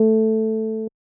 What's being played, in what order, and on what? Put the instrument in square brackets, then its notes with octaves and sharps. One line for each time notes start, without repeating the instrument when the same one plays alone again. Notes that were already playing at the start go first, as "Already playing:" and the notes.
Already playing: [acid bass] A3